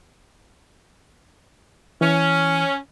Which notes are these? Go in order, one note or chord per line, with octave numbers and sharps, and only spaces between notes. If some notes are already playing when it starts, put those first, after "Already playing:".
E3 C#4